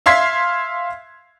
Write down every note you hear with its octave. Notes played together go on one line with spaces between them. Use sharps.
E5 F5 C6 G#6 B6 C7